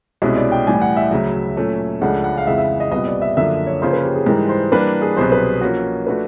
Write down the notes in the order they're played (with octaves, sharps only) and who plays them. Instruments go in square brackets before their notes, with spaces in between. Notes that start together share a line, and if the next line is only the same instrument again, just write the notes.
[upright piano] C2 B2 G#3 C#4 E4 [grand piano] D#5
[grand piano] D5
G5
[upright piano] A2 E3 G3 [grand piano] G#5
[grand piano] F#5
E5
[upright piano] D2 C#3 F#3
A#2 F#3 A3 C#4
[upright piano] C#2 C#3 F3 A3 D4 [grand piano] F#5
[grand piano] F#5
F5
[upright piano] F2 C#3 E3 G#3 [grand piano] E5
[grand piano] E5
D#5
[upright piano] C2 A#2 G3 B3 [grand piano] D#5
[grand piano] D5
E5
[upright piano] F#2 D3 F3 A#3 D4 [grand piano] E5
[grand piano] C#5
[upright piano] C#3 F3 A#3 C#4 F4 [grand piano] C5
[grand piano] B4
G4
G#4
[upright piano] G#2 E3 G3 [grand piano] A#4
[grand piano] C5
[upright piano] E3 G3 A#3 D4 [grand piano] B4
[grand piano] G#4
[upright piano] C2 B2 F#3 [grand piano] C5
[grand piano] B4
[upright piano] F3 A#3 C#4 F#4
[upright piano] F3 A3 D4 F#4 [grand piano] B4